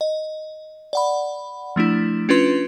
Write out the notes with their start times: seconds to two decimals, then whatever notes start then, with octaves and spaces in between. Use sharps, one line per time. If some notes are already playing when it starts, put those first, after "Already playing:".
0.01 D#5
0.93 D5 F#5 B5
1.76 F3 A3 D4 E4
2.29 C#4 D4 F4 B4 C6